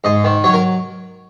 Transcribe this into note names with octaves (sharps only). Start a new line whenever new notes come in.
G#2 D#5
D#3
F#3 C#5
A#4